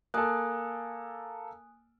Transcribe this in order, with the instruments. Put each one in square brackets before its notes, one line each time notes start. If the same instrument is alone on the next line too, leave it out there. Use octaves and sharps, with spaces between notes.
[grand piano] A#3 A4 [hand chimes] G#5 D#6 F#6